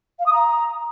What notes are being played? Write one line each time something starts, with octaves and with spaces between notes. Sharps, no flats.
F5
D#6
A#5